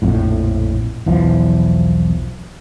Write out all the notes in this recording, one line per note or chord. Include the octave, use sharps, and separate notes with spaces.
A#1 F2 A2
B1 E2 E3 F3